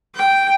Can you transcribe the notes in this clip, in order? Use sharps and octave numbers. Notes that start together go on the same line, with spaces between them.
G5